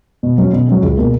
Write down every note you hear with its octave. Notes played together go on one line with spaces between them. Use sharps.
B2
F#3 C#4
B2
F#3 C#4
C#2
B2 A#3